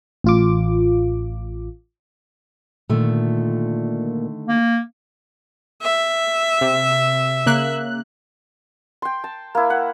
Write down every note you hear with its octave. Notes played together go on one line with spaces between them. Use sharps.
A1 F4 D6
A#2 D3 D#3 A3
A#3
E5
C3
C#3 A#3 F#6
G5 C6
A5
A#3 E4
F#5